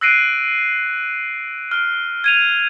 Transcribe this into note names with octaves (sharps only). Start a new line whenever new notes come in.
E6 F#6 A#6 C7 D7 D#7
F6
G#6 D#7 F7